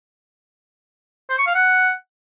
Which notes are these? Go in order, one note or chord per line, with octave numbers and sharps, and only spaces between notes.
C5
C#6
F5
F#5